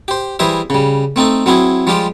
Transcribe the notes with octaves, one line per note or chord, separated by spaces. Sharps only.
G4 C5
E3 G3 G#4 C5 E5
C#3 G3
A3 C4 D#4 A4
F#3 C4 E4 G#4
F3 G3 G#3 F4 G4 D6